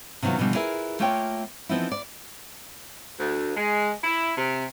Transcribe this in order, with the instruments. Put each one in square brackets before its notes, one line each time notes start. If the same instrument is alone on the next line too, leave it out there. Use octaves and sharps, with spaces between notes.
[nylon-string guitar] C3 D#3 F#3 B3 F4
B2 D3 E3 F3 G3
E4 F4 G#4 A#4 B4 D5
A3 A#3 F4 C#5 G5
E3 F3 B3 C4 D#4 E4
D5
[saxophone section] D2
G#3
E4
C3